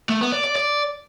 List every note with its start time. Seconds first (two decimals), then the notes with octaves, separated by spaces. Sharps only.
0.09 A3
0.21 B3
0.32 D5
0.44 D5
0.56 D5